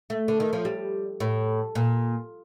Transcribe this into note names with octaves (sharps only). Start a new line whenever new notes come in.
A3
D3
D#3
F3
G3
A2
A#2